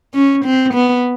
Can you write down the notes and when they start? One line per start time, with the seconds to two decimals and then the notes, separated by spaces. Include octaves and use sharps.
0.14 C#4
0.45 C4
0.74 B3